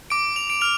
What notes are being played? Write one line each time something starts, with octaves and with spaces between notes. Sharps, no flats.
D6 D7
F7
D7
F6 F7